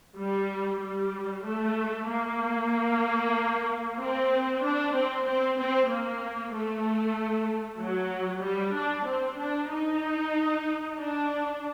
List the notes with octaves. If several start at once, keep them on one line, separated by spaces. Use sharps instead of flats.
G3
G3
A3
A#3
C4
D4
C4
C4
C4
A#3
A3
F#3
G3
D4
C4
D4
D#4
D4